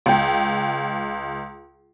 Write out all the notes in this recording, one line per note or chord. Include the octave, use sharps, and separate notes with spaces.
C#2 G5